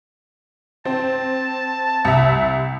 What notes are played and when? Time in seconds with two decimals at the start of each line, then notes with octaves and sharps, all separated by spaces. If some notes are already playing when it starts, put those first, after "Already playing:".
0.85 C4 A5
2.05 C2 E5